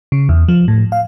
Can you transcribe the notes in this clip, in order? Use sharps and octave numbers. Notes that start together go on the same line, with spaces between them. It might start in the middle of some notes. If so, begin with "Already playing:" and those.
C#3
E2
F3
A2
F5